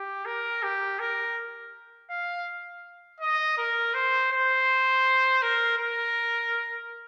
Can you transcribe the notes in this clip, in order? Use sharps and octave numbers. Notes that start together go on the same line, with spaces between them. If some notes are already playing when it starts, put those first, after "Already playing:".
Already playing: G4
A#4
G4
A#4
F5
D#5
A#4
C5
C5
A#4
A#4